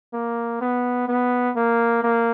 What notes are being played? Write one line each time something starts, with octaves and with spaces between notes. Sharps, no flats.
A#3
B3
B3
A#3
A#3